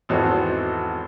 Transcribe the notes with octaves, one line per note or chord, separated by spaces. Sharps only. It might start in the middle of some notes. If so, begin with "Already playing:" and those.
G#1 E2 C4 F#4 A4